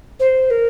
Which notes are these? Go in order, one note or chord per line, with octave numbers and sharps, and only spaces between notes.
C5
A#4